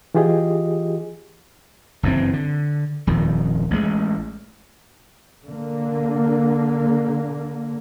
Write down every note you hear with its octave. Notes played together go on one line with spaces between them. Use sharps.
E3 F4 G4 G#4 D#5
F#1 G2 E3 C4
D3
D#1 F2 D#3
A1 G#3
D3 A#3